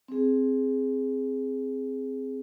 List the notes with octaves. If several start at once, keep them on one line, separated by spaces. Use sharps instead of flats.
C4 G#4